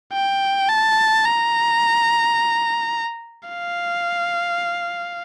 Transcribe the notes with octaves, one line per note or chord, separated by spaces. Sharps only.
G5
A5
A#5
F5